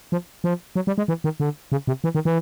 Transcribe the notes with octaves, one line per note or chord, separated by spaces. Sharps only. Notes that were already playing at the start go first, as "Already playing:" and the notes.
F3
F3
F#3
G3
G#3
E3
D#3
D3
C#3
C3
E3
D#3
E3